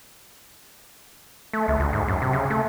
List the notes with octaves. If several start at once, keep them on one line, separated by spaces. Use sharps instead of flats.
A3
C#2
D2
G#2
F#2
C3
C#3
A3